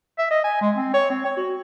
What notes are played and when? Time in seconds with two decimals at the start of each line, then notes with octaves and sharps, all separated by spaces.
0.18 E5
0.31 D#5
0.44 G#5
0.61 G#3
0.75 C4
0.94 C#5
1.10 C4
1.25 C#5
1.37 F#4